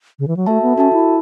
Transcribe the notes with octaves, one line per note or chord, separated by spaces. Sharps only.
C#3
E3
F#3
A3 F#4 A4 E5 A5
B3
C#4 F#4 A4 E5 A5
E4